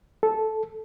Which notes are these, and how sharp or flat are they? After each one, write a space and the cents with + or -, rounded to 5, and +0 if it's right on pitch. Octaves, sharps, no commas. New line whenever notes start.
A4 -10